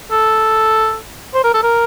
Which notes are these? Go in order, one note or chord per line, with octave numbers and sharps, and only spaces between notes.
A4
C5
A#4
A4
A#4